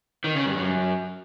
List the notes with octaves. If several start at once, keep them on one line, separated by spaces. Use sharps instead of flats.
D#3
C#3
G2
F#2